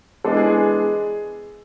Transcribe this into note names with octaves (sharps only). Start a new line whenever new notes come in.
E3 G#3 B3 D4 A4
G#4
G#4